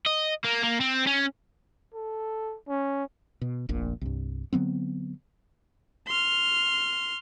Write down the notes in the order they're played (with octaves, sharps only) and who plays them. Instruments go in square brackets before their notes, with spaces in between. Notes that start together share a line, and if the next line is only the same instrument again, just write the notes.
[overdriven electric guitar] D#5
A#3
A#3
C4
C#4
[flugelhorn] A4
C#4
[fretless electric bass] B2
F1 A#1 A#2
C2 G2
D3 F#3 B3 C4
[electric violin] C6 F6